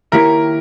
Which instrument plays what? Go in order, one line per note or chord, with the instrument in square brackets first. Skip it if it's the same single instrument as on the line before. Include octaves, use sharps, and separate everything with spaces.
[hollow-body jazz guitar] D#3 A#3 E4 G4 C#5 [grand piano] A#4